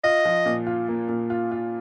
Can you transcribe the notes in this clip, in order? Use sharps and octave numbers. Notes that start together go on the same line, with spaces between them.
F4 D#5
F3
A#2
F4
A#3
A#2
F4
F4